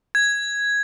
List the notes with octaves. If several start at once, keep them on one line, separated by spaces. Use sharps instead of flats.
G#6